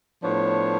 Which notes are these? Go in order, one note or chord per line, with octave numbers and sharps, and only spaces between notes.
A2 F3 B3 D4 C#5